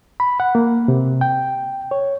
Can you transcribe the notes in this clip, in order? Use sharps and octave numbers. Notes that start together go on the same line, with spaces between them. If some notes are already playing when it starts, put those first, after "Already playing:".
B5
F#5
A#3
C3
G5
C#5